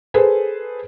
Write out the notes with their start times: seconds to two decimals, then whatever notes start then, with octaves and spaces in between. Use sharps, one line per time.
0.14 G#4 A4 B4 C5